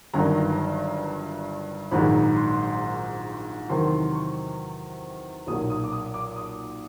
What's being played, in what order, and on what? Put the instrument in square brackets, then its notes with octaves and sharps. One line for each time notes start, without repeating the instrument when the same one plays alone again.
[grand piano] G1 G2 D#3 F#3 A#5
A#1 G#2 D#3 F#3 B5
C6
E2 C3 D#3 F#3 C6
C#6
B1 A#2 F#3 D#6
D#6
D6
D#6
D6
D#6